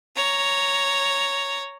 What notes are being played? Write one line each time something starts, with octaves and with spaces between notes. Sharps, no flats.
C#5 A#5